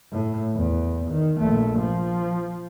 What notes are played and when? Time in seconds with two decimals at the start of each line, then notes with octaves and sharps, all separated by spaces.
0.12 A2
0.55 E2
1.11 D#3
1.40 A#1 A3
1.79 F3